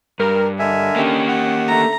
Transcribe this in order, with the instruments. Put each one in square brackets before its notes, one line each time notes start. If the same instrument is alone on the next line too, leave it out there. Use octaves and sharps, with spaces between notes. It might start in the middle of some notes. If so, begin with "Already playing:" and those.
[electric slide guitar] G2 [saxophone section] A#4
[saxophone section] D3 A#4 D#5 [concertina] E5 G#5
[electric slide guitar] A#3 G4 [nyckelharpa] C#4
[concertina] F#5
[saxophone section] D3 A3 [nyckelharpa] A#5